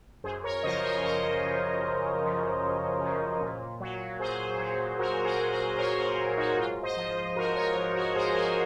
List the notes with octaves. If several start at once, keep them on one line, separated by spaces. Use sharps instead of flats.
F#2 G#4 C5
A#4 C#5
C#3 F3 C5 D#5
A#4 C#5
F#2 C5 D#5
C#3 F3
F#2
C#3 F3
F#2
C#3 F3
A#2
F#3
A#2 G#4 C5
F#3
A#2 F#4 A#4
G#4 C5
F#3
G#4 C5
C5
A#2 A#4 C#5
G#4 C5
F#3
D#4 F#4
G#2 F4
C5 D#5
F3
G#2 F#4 A#4
A#4 C#5
F3
F#4 A#4
G#2 G#4 C5
F#4 A#4